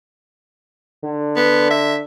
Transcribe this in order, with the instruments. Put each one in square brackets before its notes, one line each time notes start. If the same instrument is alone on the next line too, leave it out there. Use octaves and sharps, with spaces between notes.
[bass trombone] D3
[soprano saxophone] B3
E5